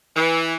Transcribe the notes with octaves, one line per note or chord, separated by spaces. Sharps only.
E3